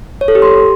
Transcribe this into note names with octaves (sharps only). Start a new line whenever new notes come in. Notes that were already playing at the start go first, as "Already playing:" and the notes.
C#5
A4
G4
C6